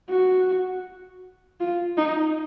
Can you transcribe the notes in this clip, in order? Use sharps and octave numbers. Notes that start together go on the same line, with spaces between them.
F#4
F4
D#4